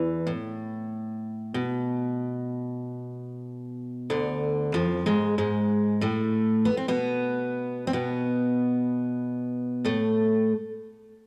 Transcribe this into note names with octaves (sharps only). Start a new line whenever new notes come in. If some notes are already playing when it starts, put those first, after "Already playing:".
Already playing: E2 E3
A2
B2
D2 D3
F2 F3
G#2 G#3
G#2 G#3
A2 A3
B3
C4
B2 B3
C4
B2 B3
A2 A3